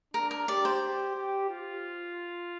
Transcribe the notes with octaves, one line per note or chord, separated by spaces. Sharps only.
D4 A#4
A#4
G4 D5
C5
G4
G4
F4